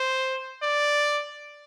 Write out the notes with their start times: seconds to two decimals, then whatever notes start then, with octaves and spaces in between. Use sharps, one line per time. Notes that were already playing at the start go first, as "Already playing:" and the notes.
Already playing: C5
0.62 D5